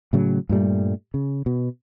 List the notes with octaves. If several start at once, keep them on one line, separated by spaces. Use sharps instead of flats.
A2 C#3 F#3
G2 A#2 G3 A3
C#3
B2